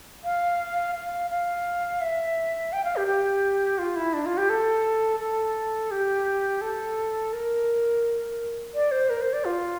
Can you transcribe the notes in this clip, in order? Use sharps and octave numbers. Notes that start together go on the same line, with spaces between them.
F5
F5
F5
E5
G5
F5
G4
G4
F4
E4
D4
F4
G4
A4
A4
G4
A4
A#4
D5
C5
A#4
C5
D5
F4